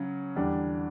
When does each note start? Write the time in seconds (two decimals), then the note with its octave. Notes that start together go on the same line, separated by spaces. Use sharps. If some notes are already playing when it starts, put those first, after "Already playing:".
Already playing: C#3 F#3 C#4
0.36 E2 D3 G3 D4 G4